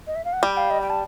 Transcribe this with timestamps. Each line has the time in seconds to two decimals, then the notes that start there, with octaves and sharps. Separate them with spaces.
0.07 D#5
0.16 E5
0.25 F5
0.33 F#5
0.43 G3 G5
0.57 F5
0.71 D#5
0.81 G5
0.90 A5